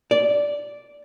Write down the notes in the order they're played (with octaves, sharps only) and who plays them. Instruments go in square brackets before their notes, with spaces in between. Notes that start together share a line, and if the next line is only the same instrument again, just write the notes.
[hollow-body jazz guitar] D5